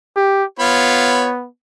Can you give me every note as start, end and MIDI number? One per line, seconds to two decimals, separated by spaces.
0.16 0.44 67
0.59 1.47 59
0.59 1.29 65
0.59 1.29 73
0.59 1.29 83